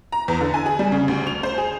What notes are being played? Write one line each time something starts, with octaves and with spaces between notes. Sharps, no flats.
A#5
E2
D3
G#5
G#4
G3
C#3
D2
F7
C5
G#4